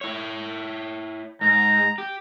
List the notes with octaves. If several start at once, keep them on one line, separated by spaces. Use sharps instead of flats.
E4 C#5
G#2 A#5
G4